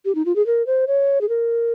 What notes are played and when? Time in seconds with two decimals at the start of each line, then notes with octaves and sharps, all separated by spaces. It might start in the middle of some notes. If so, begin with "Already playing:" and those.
0.05 G4
0.15 D#4
0.26 F4
0.36 G#4
0.46 A#4
0.67 C5
0.87 C#5
1.21 G#4
1.29 A#4